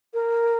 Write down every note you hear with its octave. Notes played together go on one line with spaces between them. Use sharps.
A#4